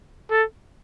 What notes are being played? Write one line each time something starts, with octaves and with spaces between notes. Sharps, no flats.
A4